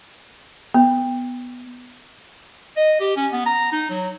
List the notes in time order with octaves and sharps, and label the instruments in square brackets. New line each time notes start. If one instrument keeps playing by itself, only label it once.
[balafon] B3
[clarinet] D#5
G4
C#4
B3
A#5
D#4
F#3